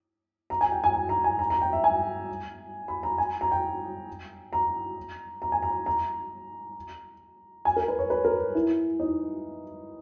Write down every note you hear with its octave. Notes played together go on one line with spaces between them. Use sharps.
A#5
G#5
G5
G#5
G#5
A#5
G#5
A#5
A#5
G5
E5
G#5
B5
A#5
G#5
A#5
G5
A#5
A#5
G#5
A#5
A#5
G#5
A#4
B4
C#5
B4
A#4
E4
D#4